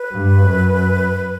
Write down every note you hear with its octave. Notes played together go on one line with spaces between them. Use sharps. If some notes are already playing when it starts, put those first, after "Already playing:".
Already playing: B4
G2
F#2